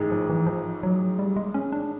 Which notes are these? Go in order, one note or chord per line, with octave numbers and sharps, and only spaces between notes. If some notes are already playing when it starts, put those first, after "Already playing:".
Already playing: A1 G#2 D#3 G#3
F3
E3
F3
F#3
G3
G#3
C#4
D4